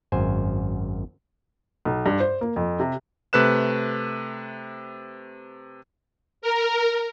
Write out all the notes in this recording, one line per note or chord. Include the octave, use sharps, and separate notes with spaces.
G#1 F#2 C5 G#5
B1
G2
C5
A#3
F2
C3
C3 A3 B4 F#6 E7
A#4